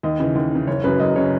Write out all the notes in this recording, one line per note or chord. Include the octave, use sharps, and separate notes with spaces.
D#2 D#5
C#3 E3
D#2
C#3 E3
F#1 C#5
F#2 C#3 F#3 B4
F#1 D#5
C#3 F#3 C#5